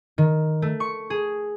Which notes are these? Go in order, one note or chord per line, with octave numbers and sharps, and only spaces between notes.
D#3
A3
C#6
G#4